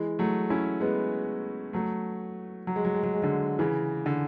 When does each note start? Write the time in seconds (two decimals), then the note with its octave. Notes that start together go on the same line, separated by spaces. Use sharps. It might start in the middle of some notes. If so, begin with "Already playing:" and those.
Already playing: E3 G#3
0.19 F#3 A3
0.50 C#4 E4
0.81 G#3 B3
1.73 F#3 A3
2.67 F#3
2.76 G#3
2.85 F#3
2.95 G#3
3.03 F#3
3.14 G#3
3.22 D3 F#3
3.59 C#3 E3
4.06 D3